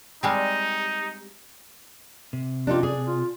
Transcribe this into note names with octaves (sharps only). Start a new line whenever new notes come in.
G3 G#3 C4 D#4
C3
D4 D#4 F4 G4
G#4 D5
F4